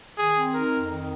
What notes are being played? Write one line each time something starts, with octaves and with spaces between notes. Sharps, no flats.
D#3 G#4
C4
D#4 A#4
F2
D#3